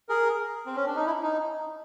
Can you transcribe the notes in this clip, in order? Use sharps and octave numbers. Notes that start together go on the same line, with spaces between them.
G#4 A#4
C4
C#4
D4
D#4
E4
D#4